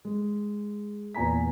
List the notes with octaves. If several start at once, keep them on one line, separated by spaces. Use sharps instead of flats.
G#3
E2 A#2 G#5 A#5 B6